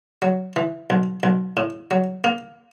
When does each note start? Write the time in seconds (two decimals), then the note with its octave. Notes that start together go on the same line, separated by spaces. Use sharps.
0.22 F#3
0.56 E3
0.90 B1
1.23 B1
1.57 A2
1.91 F#3
2.24 A#3